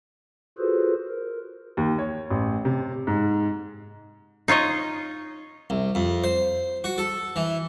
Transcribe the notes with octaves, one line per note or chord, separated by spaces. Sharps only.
F4 F#4 G#4 A4 B4 C5
A#4
D#2
C#5
A1
C3
G#2
D#4 F4 C#5 D#5
C2
F2
C5
F#4
A4
E3